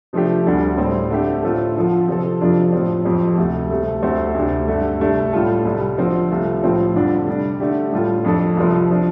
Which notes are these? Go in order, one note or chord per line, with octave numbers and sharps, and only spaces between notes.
C3 F3 A3 D4 G4
D2 D3 G3 D4 A4
A2 G3 C4
D3 A3 D4 G4
A2 A3 C4 F4 A4
D3 F3 D4 F4 A4
C3 F3 C4 A4
F2 C3 F3 D4 F4
A2 F3 C4
F2 F3 C4 G4
D2 C3 A3
C2 C3 A3
D2 D3 A3 C4
D2 C3 A3 D4 G4
G2 D3 A3
C2 C3 A3 D4
A2 G3 F4 A4
C2 C3 G3
D3 F3 C4
C2 C3 A3 F4
A2 F3 C4 F4 A4
F2 D3 G3 D4 F4
C3 G3 D4
D3 A3 D4 G4
A2 G3 F4 A4
F2 F3 D4 A4
C2 C3 F3 C4
F3 D4